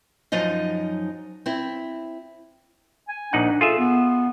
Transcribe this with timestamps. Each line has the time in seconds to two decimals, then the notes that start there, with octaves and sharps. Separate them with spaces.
0.32 F#2 F3 F#3 D#4 D#5
1.46 C4 E4
3.08 G#5
3.33 A#1 D4 D#4 F#5
3.61 F4 G#4 A4 E5
3.78 B3